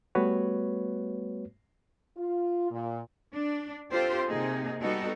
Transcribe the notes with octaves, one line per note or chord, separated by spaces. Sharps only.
G3 A3 B3 F#4 B4 C#5
F4
A#2
D4
C4 F4 G4 A4 C5
C3 A#3 D#4 G#4
G3 B3 D#4 F#4 A4